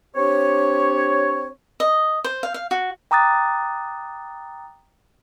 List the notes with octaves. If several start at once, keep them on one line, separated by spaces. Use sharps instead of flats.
C4 D4 G4 C#5
D#5
C5
F5
F5
F#4
G5 A#5 D6 D#6 F#6 A6